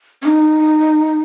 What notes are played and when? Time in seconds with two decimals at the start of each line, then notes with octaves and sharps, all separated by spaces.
0.22 C#4
0.25 D#4